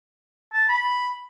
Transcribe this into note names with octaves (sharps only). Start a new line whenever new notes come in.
A5
B5